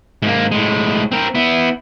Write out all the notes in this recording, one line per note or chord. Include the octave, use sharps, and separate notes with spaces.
G#2 A#3
A2 G#3
C4 A#4
B3 E4